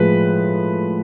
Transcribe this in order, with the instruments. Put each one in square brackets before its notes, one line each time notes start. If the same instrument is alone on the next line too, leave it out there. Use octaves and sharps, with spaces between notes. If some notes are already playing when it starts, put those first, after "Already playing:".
Already playing: [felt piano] A2 F3 G#3 [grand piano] B4